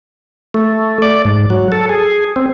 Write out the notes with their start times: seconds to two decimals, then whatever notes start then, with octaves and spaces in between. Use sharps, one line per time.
0.54 A3
1.02 D5
1.25 G#2
1.50 F#3
1.72 A4
1.89 G#4
2.36 C4